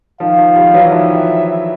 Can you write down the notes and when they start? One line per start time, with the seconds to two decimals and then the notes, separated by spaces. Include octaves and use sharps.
0.20 D#3 F3 F5
0.38 D#3 F3
0.56 F3 G3
0.74 E3 F#3
0.91 D#3 F3 E5